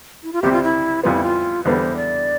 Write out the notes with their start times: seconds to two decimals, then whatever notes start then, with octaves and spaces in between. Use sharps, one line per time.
0.23 E4
0.33 F4
0.42 C2 C3 G3 C4 G4
0.53 F4
0.63 E4
1.04 F2 E3 G3 B3 F4
1.14 E4
1.24 F4
1.65 E2 D3 G3 B3 C5
1.96 D5